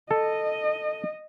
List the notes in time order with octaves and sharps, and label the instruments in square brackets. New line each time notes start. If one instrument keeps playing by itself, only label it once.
[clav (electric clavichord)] A4 [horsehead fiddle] D#5